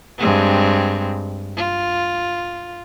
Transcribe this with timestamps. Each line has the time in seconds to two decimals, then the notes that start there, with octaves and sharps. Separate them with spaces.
0.19 G2 G#3 C4
1.57 F4